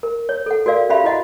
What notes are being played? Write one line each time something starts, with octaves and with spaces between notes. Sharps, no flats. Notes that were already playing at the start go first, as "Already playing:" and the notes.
A#4
C#5
A4 F#5
F#4 A#4 D5 F5
C#4 F#4 G4 E5 F5 B5
E4 F#4 D#5 F#5